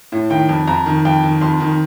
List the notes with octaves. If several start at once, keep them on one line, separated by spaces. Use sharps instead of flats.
A2
D#3 G5
F2
F2 A#5
D#3
F2 G5
D#3
F2 C6
D#3